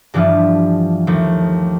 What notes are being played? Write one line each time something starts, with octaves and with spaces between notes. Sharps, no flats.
G2 E3 F3 G3 D4 F4
D#2 F3 A3